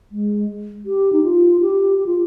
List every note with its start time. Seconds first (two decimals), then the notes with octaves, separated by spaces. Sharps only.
0.11 G#3
0.86 G4
1.12 D#4
1.24 F4
1.61 G4
1.98 G4
2.06 F4